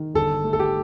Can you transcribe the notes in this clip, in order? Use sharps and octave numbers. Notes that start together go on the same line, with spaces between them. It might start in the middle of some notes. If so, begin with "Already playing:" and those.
Already playing: D#3
G1 A4
A3
A4
G4